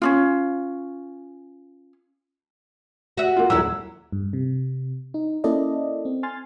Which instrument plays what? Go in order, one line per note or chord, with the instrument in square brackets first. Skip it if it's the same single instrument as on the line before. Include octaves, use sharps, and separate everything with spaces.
[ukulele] C#4 D4 F4
[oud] F#4 E5
[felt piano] A#3 F4
[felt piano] D#1 E6 [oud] F#3 E4
[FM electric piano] G2
C3
D#4
A#3 C#4 E4 A4 D5 D#5
C4
G#5 C6 F6 A6